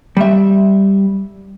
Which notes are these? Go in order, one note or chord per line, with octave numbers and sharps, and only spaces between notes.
G3 E5